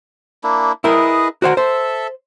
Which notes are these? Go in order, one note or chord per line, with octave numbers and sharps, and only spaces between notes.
A#3 D4 E4
E4 G#4 A#4 B4 D#5
F#4 A#4 C5 F#5
A4 C5 E5